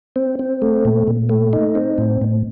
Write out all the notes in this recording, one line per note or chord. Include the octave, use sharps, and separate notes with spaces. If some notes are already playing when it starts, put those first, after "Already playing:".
C4
C4
A3
A#2
A#2
A3
D#4
C4
A2
A2